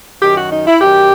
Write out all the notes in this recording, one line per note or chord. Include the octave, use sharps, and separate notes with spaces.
F#2 D#3 G4
F#4
D#4
E4
F#2 D#3 G4